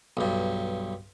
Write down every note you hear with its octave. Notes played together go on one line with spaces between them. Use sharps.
B1 G2